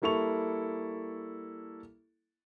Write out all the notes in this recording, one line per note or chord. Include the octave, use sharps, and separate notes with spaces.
G3 A#3 E4 A4 C#6 F7